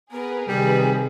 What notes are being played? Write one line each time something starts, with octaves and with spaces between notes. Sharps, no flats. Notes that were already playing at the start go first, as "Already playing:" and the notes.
B3 G#4 A#4 B4
C3 D#3 G3 D#4 G#4 B4